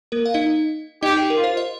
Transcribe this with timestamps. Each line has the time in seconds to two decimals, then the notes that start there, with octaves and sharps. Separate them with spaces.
0.12 A#3 A#4
0.26 F5
0.34 D#4 D#5
1.03 D#4 G4 D#5
1.17 G4
1.30 A#4
1.37 F4
1.44 C5
1.57 D#5